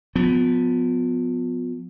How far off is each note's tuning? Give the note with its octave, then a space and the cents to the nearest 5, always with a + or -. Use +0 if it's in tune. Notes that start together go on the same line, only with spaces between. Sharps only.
F3 +35 B3 +20